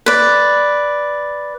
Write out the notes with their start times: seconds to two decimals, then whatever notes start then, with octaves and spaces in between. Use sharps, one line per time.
0.06 B4 D5